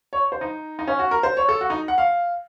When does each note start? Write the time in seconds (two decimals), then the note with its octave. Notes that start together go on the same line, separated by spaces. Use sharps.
0.13 C#5
0.32 C5
0.41 D#4
0.79 D#4
0.87 C#4
0.99 F#4
1.11 A#4
1.23 C5
1.37 C#5
1.49 A4
1.61 F#4
1.70 D#4
1.88 F#5
1.98 F5